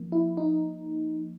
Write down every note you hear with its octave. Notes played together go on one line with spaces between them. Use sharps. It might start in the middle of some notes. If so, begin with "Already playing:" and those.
Already playing: F3 A#3
E4
D#4